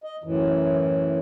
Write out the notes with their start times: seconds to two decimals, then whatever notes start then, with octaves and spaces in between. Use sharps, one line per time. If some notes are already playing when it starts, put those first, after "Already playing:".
0.04 D#5
0.24 F#2 A2 E3